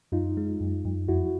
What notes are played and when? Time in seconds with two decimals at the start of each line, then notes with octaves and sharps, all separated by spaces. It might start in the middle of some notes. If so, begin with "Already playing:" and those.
0.12 F#2 D#4 F4
0.37 G#3
0.60 F#2
0.85 F#2
1.08 F2 E4 F#4